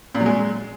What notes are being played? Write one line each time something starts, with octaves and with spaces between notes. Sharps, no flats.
A#2
F#3
G#3